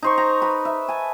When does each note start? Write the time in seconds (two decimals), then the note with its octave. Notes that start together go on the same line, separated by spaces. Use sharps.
0.03 D#4 C5 C#6
0.18 A#5
0.41 B4 B5
0.65 E5
0.88 G#5 A5